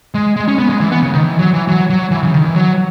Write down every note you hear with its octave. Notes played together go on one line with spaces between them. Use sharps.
G#3
G#3
C#4
B3
G#3
E3
B3
C#3
D#3
E3
F#3
E3
F#3
F#3
E3
C#3
D#3
E3
F#3